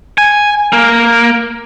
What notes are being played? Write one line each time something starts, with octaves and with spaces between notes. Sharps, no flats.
G#5
A#3